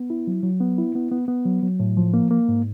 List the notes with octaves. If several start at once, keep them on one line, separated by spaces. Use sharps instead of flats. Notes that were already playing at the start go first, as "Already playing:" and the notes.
Already playing: B3
E4
F#3
F#3
B3
E4
B3
B3
B3
F#3
F#3
A2
F3
A#3
A#3
G#2